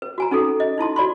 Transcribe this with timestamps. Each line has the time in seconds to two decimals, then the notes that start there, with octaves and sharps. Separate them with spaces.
0.02 B4
0.18 F#4 G#5 A#5
0.31 C#4 D#4 G#4 A4
0.60 D#5
0.78 D#4 E4 A5 C6
0.96 F#4 D5 B5 C6